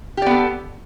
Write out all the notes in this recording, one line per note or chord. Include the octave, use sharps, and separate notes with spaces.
B3 G4 A4 D5